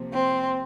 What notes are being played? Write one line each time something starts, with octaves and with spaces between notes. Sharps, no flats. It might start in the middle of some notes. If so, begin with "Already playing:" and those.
Already playing: C3 F3 A#3
C4